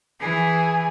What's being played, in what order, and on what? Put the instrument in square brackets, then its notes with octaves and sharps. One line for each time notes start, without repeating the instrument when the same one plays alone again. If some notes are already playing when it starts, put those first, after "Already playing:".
[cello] E3 [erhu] G#4